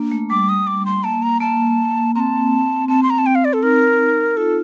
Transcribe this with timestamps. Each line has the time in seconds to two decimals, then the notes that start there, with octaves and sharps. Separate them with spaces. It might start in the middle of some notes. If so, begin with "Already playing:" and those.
Already playing: A#3 D4
0.12 A3
0.30 G3 D6
0.49 D#6
0.67 D6
0.86 C6
1.04 A#3 A5
1.23 A#5
1.40 A#3 A5
2.15 C4 A5 A#5
2.88 C4 A5
3.03 C6
3.10 A#5
3.18 A5
3.26 G5
3.35 F5
3.45 D5
3.53 A4
3.63 D#4 A#4
4.37 F4 A4